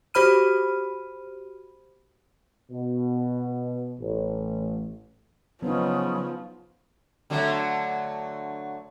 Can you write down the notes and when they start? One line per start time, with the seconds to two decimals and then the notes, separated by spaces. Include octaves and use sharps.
0.14 F#4 G4 C5 B5 F6 D#7
2.72 B2
3.99 A1
5.62 C#3 F3 F#3 B3 D#4
7.30 D3 F#3 A3